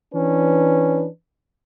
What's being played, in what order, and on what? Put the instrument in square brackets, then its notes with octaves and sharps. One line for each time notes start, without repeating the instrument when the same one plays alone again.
[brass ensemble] E3 C#4 D4 B4